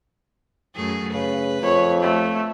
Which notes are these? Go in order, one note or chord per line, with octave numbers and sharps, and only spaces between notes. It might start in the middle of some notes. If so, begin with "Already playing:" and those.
F#2 A3 G#4
C#3 B4
F2 C#5
A3